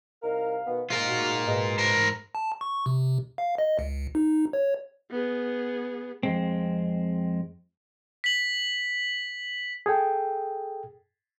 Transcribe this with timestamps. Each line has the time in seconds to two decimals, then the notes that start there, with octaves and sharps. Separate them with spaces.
0.21 C2 D#4 A#4 F5
0.65 B2 D#3 B3
0.90 G#2 F4 A#4 C7
1.08 F#4
1.46 G#2 B2 G#3
1.79 A#4 C5
2.35 A5
2.61 C#6
2.86 C3
3.38 F5
3.58 D#5
3.79 C#2
4.15 D#4
4.53 C#5
5.11 B3 G#4
6.23 F2 G#3 C4
8.24 B6 F#7
9.86 G#4 A4 G5